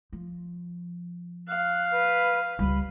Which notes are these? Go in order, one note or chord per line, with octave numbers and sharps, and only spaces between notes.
F3
F5 F#6
B4
C#2 G3 B5